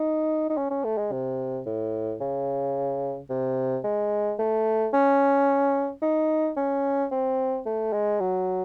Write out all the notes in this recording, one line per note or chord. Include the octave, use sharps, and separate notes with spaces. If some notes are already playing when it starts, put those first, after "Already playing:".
Already playing: D#4
D#4
C#4
C#4
A3
G#3
C3
A2
C#3
C3
G#3
A3
C#4
D#4
C#4
C4
A3
G#3
F#3